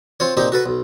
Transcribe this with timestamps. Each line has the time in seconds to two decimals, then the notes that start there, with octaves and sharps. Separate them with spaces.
0.20 C4 F4 C#5
0.37 A#2 C4 D#4 G4
0.52 F#4 A4 B4
0.66 B1